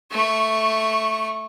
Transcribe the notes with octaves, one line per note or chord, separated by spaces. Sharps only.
A3 C#6